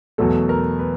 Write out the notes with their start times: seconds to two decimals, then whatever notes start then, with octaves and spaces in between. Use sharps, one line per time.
0.18 E2 B2 F#3 A3 A4
0.49 A#4
0.79 B4